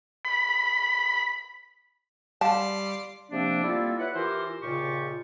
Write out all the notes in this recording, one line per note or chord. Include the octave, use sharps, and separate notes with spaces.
B5
G3 D5 F5 A5 C6 D6 C7
C3 F3 A#3 C4 D4
G3 A#3 E4 F4 A4 E5
E4 B4 C#5 F#5
E3 F4 G4 A#4 C5
D#2 A#2 C#3 F4 G4 C#6